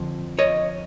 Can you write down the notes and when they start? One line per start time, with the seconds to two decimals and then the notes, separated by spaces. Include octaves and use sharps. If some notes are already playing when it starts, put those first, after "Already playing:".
Already playing: F2 D3 F3
0.39 C#5 D#5